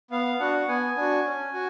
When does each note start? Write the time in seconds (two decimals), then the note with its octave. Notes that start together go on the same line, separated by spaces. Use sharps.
0.11 B3 F5
0.40 D4 F#4 F#5
0.68 B3 G#5
0.96 D4 F#4
1.26 C#4
1.53 F#4